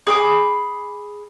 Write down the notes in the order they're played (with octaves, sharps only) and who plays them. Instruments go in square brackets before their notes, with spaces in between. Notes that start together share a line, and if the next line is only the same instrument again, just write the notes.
[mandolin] G#4 B5 D6